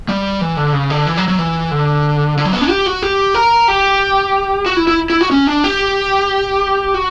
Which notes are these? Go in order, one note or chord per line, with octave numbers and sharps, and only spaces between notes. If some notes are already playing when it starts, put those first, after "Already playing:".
G3
E3
D3
C#3
D3
E3
F#3
F#3
E3
D3
D3
F#3
B3
C#4
G4
F#4
G4
A#4
G4
F#4
E4
E4
E4
F#4
C#4
D4
G4
F#4